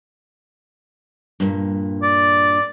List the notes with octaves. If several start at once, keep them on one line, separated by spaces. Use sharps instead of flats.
G2 A#2
D5